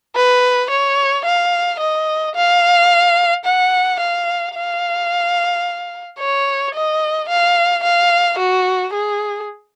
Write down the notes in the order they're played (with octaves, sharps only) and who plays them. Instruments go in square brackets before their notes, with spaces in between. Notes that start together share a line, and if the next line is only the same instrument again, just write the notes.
[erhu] B4
C#5
F5
D#5
F5
F#5
F5
F5
C#5
D#5
F5
F5
F#4
G#4